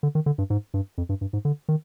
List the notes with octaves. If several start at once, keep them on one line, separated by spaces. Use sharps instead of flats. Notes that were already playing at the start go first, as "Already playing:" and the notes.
D3
D#3
D3
G2
G#2
G2
F2
G2
G2
G#2
D3
D#3